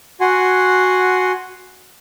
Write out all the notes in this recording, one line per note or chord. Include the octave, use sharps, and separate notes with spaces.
F#4 F#5 G#5 C6